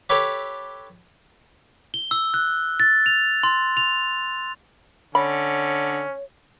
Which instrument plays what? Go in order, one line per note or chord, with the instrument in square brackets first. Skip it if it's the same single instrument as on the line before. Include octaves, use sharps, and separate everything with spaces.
[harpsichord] G4 A4 B4 C#5 G5
[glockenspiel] G7
E6
F#6
A6
F7
C6
F7
[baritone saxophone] D3 [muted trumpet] C#4 [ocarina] C#5 [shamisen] B5